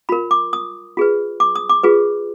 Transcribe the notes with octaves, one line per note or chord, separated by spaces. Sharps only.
F4 A#4 B5
D6
D#6
F4 G#4 B4
D6
D#6
D6
F4 G#4 B4